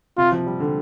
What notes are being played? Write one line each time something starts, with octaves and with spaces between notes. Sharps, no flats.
C3 F4
F3
G3
D3